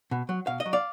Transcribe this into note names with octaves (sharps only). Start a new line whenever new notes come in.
B2
F#3
B2 F5
D#5
F#3
D5 F5